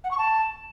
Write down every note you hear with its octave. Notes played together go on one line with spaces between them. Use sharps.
F#5
C#6
A5